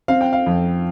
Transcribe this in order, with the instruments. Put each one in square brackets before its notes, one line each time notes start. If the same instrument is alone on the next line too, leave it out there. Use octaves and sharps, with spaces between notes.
[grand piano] C4 F5
G5
F5
F2